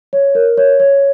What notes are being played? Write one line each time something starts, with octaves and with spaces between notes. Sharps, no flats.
C#5
A#4
C#5
C#5